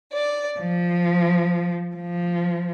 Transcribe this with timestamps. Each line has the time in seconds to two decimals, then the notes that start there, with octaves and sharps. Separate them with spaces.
0.13 D5
0.58 F3
1.95 F3